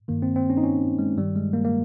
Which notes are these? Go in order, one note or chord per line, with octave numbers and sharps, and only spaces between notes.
G2 D#3 A#3
C4
C4
C#4
D#4
C#4
G#3
G2 D#3 G3
G#3
A#3
A#3